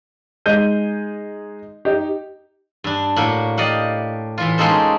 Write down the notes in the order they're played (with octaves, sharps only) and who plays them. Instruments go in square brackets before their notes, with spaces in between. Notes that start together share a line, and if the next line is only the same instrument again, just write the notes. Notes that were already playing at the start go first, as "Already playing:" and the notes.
[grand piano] G#3 D#4 D#5 G6 D#7
D#4 G4
[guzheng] G2 D4
A2 A#3 F#4
G4 D5 D#5 F5 F#5
A2 E3 F4
G#3 A#3 C#4 D#4 A4 C5